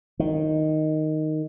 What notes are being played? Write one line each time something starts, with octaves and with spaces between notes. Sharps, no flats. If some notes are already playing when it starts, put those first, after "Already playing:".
D#3